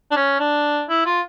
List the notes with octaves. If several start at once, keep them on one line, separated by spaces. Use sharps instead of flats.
D4
C#4
D4
E4
F4